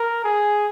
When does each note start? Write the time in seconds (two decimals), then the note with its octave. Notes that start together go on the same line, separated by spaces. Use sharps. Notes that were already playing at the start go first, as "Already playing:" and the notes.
Already playing: A#4
0.24 G#4